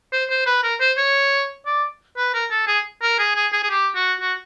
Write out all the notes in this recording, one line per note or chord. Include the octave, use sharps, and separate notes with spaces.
C5
C5
B4
A#4
C5
C#5
D5
B4
A#4
A4
G#4
A#4
G#4
G#4
G#4
G#4
G4
F#4
F#4